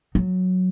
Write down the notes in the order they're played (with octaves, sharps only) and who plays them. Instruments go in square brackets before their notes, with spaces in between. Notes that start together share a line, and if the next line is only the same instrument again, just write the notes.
[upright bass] F#3